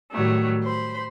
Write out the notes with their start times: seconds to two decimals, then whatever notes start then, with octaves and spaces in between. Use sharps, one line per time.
0.12 A2 D#3 F#3 G3 A3
0.63 C5 B5